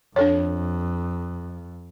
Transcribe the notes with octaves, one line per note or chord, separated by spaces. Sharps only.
F2 D4 A4 C#5